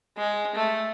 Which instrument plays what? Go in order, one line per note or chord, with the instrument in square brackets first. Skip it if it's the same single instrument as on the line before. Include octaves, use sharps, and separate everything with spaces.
[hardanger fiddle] G#3
A3